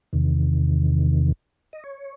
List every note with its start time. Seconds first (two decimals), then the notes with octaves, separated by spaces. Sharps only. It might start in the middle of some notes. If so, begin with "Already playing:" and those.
0.13 E2 C3 D#3
1.73 D#5
1.84 C#5